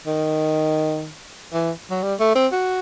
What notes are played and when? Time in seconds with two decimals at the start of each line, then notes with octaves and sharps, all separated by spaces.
0.07 D#3
1.53 E3
1.90 F#3
2.03 G3
2.19 A3
2.35 C4
2.52 F#4